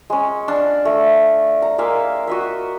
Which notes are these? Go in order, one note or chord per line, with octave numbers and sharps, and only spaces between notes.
G#3 C#4
D4 F5
A3
A#5
G#3 A#3 E5 F5
F#4 D#5 E5